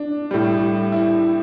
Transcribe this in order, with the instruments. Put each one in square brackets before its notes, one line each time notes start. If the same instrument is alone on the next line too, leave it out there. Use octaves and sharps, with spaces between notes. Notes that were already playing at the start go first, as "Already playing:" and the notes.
Already playing: [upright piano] D4
A2 G3
E4